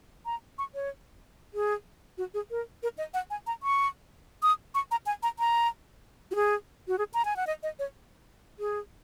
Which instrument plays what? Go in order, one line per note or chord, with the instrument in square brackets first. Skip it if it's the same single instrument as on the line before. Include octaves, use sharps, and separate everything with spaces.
[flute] A#5
C#6
C#5
G#4
F#4
G#4
A#4
A#4
D#5
F#5
G#5
A#5
C#6
D#6
C#6
A#5
G#5
A#5
A#5
F#4
G#4
F#4
G#4
A#5
G#5
F#5
D#5
D#5
C#5
G#4